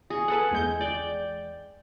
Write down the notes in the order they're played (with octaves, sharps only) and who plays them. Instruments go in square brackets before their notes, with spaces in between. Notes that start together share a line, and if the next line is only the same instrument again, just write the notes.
[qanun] G#4 C#6
[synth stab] G#4 A4 B4 [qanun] F#5
[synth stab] E2 G#3 G6
[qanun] D5 G5